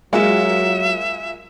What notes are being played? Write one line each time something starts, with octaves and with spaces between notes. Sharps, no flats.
F#3 G#3 A#3 F4 F#4 E5